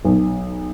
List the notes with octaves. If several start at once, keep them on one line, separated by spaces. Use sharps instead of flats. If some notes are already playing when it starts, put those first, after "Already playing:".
B1